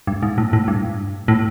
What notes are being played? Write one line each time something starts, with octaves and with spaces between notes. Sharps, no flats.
G2
G#2
A2
A2
G2
A2